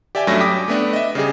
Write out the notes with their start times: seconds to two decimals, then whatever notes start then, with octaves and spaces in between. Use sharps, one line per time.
0.15 G4 D5 E5 G5 G#5
0.27 G2 F#3 A3 C#4 E5 A#6
0.41 G5 D6 D#6 B6
0.68 A3 B3 D4
0.93 D#5 E5
1.15 C#3 G3 G4 G#4